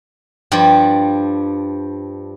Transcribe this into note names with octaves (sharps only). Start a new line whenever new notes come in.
G2 F3 G3